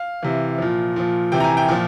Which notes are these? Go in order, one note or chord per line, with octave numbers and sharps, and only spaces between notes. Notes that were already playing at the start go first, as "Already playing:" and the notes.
Already playing: F5
C3 E3
A#2 F3
A#2 F3
C3 E3 G5
A#5
G#5
G5
A#2 F3